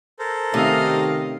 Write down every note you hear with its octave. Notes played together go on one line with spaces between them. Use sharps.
A4 A#4 C5
C3 D#3 A3 C#4 G4 D#5 F5